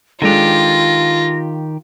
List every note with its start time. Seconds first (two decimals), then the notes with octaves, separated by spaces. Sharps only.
0.22 D#3 G#3 D4 F4 G4 A4 A#6